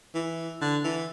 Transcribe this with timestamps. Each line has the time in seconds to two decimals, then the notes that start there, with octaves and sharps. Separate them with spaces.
0.15 E3
0.61 D3
0.84 E3